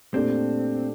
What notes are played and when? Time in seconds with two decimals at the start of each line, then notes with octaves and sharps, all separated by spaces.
0.14 A#2 A3 C4 D4 G4